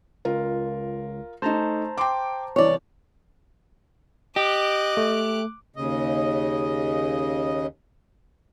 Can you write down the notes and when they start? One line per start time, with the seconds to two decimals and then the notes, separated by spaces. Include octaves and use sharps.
0.25 C#2 F4 A#4
1.42 A3 D#4 C5 A5 A#5
1.98 G5 C6 D6
2.56 C2 E3 C#5 D5
4.36 G4 D#5 D6 F#6
4.97 A3
5.76 D#2 C#3 D#5